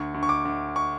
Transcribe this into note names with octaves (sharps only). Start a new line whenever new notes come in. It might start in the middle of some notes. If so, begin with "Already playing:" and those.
Already playing: D2 C#6
D2
C#6
D6
D2
C#6